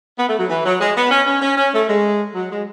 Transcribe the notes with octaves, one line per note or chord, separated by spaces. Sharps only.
B3
A3
F#3
E3
F#3
G#3
B3
C#4
C#4
C#4
C#4
A3
G#3
F#3
G#3